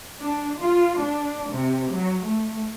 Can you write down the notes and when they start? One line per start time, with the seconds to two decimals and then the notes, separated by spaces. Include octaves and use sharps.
0.22 D4
0.61 F4
0.99 D4
1.50 C3
1.91 F#3
2.25 A3